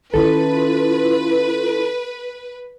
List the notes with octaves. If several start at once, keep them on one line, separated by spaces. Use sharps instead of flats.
D#3 C#4 E4 F4 A4 B4